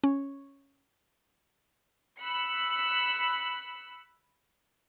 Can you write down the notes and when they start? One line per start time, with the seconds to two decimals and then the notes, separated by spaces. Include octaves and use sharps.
0.04 C#4
2.20 B5 E6 F#6 C#7